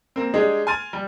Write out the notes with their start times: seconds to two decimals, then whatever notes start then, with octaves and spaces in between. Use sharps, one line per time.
0.16 A#3 C4
0.34 G#3 D4 G4 G#4
0.67 G#5 C6 F6 A6 D#7
0.93 G3